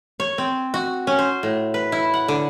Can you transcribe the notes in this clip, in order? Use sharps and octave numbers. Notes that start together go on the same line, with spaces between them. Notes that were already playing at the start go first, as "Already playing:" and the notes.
C#5
C4
F#4
C#4
C5
A2
B4
E4
F#5
D3